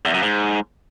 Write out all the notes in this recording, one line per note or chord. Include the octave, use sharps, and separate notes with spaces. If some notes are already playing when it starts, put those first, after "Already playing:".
E2
F#2
G#2